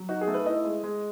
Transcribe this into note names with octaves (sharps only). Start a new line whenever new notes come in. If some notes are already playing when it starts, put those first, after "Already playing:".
Already playing: F#3
D#4 F#4
G#4
A3
B4
E4 D#5
G#3
G#3